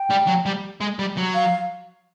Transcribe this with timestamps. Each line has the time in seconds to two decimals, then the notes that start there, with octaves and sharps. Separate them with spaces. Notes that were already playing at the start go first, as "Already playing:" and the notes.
Already playing: G5
0.10 G3
0.27 F#3
0.46 G3
0.81 G#3
0.99 G3
1.17 F#3
1.34 F5